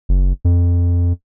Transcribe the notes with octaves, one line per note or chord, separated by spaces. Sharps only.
F#1
F2